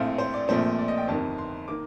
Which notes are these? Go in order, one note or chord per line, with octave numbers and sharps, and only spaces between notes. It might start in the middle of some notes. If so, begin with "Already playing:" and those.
Already playing: A#1 A2 A3 C4 F5
C5
D5
A#1 A#2 F3 A3 C4 C5
D5
D#5
G5
G1 F2 D#3 A#3 A5
C6
D#3 A#3 D6